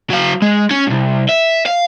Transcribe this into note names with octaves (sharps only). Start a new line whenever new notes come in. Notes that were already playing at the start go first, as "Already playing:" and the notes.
F#3 F5
G#3
C#4
C2 G#2
E5
F5